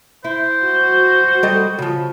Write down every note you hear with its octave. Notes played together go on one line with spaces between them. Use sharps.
E4 C5
F#4
G3 A4 D#5
C#3 F3